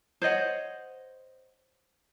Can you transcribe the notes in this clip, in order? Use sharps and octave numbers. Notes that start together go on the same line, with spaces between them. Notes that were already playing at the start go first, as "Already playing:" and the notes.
C5 C#5 D#5 F#5